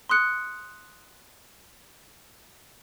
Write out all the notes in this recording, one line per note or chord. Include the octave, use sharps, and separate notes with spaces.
C6 D#6 F#6 C#7